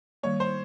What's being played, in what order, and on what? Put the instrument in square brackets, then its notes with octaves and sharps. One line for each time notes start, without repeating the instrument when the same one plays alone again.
[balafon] D#3 G3 A#3 [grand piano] C#5
[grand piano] C5